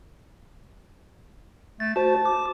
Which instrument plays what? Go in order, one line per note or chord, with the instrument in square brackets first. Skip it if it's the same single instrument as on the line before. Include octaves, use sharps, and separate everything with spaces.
[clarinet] A3 [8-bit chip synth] A6
[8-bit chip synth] F#4 C5 [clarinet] A5
[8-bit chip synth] D6